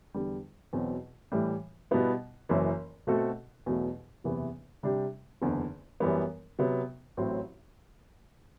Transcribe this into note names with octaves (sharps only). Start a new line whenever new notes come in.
E2 D3 G3
E2 B2 F#3 C4
A2 E3 G3
B2 G3 B3 E4 B4
F#1 F#2 E3
B2 A3 C4 F#4 A4
E2 B2 F#3 A3
F#1 E2 C3 E3 B3
C3 G3 D4 G4
F#1 E2 D3
F#2 E3 G3 B3
C3 F#3 B3
A1 A2 F#3 C4